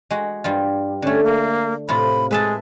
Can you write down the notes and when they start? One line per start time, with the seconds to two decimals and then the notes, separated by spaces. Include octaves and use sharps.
0.11 G#3 F#4
0.44 G2 G3 F4
1.02 D3 A3 C#4
1.24 A#3
1.89 A2 C3 F4 B5
2.31 G#3 B4 E5 A5